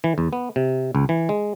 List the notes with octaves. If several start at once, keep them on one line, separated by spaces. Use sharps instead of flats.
E3
E2
B3
C3
C#2
E3
G#3